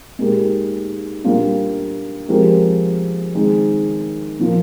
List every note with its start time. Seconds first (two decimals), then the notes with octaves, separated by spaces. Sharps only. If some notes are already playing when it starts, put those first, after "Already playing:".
0.19 A#2 G#3 D#4 G4 A#4
1.24 A#2 G3 A#3 D4 F4
2.29 F3 G#3 C4 G4 A#4
3.34 D#3 G#3 C4 D#4 G#4
4.39 A#2 F3 A#3 D#4